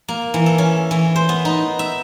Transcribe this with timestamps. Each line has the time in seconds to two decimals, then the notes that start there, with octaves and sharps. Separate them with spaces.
0.08 A#3
0.34 E3
0.46 A4
0.58 C#4
0.91 E3
1.16 C5
1.29 B3
1.45 D#4
1.79 E5